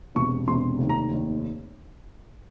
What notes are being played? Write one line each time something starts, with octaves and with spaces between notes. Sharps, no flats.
E1 E2 C3 C#6
E1 E2 C3 C6
F1 D#2 D#3
A#5
F1 D#2 D#3